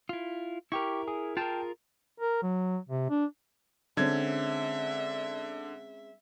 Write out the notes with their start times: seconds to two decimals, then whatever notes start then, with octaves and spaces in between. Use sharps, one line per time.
0.09 E4 F4
0.72 E4 G4 A#4 C#6
1.08 G#4
1.37 F4 G#4 A#4 G5 A5
2.20 A#4
2.42 F#3
2.89 C3
3.10 D4
3.97 D3 G#3 C4 C#4 E5 G#6